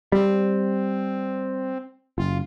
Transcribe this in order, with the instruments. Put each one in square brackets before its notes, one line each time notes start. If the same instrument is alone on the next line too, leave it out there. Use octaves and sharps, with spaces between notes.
[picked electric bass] G3 [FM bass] C4
[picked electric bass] F#1 [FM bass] F4